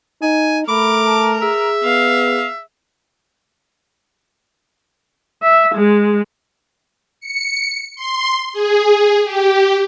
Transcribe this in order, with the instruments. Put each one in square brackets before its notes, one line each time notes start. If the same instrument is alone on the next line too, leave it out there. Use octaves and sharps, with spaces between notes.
[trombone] D#4 [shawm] G#5
[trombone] A3 [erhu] A#4 [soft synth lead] B5 [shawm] D6
[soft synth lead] A5
[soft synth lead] G#4 [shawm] E5
[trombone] B3 [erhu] F5
[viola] E5
G#3
[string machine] C#7
C6
G#4
G4